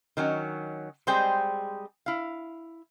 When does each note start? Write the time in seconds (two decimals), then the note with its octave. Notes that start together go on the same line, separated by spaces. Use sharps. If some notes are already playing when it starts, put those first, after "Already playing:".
0.17 D#3 F#3 C#4
1.07 G3 G#3 C4 G#4 C5 G5
2.06 E4 F5